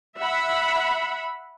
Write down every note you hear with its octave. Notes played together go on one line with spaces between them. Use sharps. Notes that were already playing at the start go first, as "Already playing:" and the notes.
E5 F#5 B5